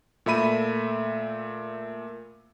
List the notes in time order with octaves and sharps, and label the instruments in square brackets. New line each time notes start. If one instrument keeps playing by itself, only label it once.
[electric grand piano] A#2 A3 E5 B5 D#7